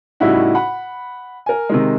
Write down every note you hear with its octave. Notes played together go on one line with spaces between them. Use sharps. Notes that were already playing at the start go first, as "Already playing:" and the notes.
A2 C#3 G3 D#4 E4 F#4
F#5 B5
A#4 G#5
C3 D#3 G#3